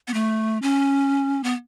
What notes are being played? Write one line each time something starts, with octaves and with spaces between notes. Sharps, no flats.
B3
A3
C#4
B3